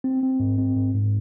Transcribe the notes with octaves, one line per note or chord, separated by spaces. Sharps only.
C4
C4
G#2
C4
G#2
G#2